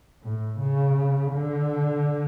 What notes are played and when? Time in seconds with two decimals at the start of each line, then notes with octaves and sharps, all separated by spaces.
0.23 A2
0.60 C#3
1.32 D3